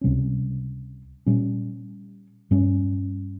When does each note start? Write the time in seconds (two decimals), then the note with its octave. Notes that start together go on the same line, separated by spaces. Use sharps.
0.01 C#2 C3 G3 C#4
1.26 A#2 G3 C#4
2.51 G2 G3 C#4